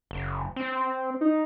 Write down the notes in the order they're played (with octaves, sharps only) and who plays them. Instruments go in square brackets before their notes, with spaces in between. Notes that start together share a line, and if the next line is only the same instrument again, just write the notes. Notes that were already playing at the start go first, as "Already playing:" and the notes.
[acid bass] F#1
C4
[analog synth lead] D#4